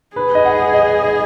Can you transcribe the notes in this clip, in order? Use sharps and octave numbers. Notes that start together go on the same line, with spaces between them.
G#4 B4
D#5
F#5
D#5
D#5